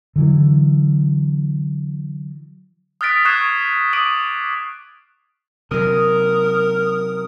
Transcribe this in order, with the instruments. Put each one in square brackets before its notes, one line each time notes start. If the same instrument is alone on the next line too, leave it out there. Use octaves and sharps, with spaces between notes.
[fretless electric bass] D3 E3 F#3
[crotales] D#6 F6 F#6 A6 B6 D7
C#6 D#6 F#6 G#6 C7 E7
D6 D#6 D7 D#7 F#7
[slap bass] C3 F#3 [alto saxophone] A#4 [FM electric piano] D#6